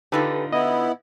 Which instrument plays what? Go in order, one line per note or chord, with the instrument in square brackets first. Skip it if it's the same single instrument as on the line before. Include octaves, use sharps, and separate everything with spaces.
[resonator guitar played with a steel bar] D3 D#4 F4 [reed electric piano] G4 A4 B4
[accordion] B3 E4 [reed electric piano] D#5